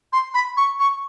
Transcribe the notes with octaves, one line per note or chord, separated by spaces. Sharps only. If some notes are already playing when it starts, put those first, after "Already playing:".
C6
B5
C#6
C#6